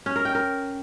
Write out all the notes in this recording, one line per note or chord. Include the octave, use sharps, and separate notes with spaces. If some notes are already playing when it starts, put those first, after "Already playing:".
C#4
A#4
G5
A#4